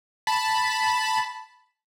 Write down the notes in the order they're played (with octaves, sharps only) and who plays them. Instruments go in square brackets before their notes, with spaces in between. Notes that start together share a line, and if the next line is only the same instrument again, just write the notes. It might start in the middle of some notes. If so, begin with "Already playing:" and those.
[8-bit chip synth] A5 B5